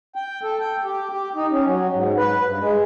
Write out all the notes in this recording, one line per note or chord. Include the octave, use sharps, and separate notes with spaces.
G5
A4
G5
G4
G4
D#4
C#4
F#3
G#2
B4
G2
G#3